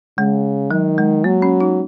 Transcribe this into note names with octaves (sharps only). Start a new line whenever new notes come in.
C#3 G#3
D#3 F#3
G#3
F#3 A#3
C#4
D#4